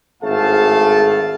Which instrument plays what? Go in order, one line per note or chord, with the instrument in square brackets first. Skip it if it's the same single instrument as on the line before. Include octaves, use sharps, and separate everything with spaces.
[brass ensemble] G#1 A2 A3 G#4 F5 A5